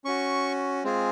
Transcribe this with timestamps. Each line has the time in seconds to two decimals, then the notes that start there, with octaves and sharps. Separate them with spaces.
0.05 C#4 F#4 C#6
0.84 G#3 C4 F4 G#4